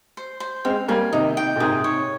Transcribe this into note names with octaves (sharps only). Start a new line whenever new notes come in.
C5
C5
G#3 C4 F5
G3 A#3 G#5
C3 D#3 D#4
G5
A#2
G#2 C3 G#4
C#5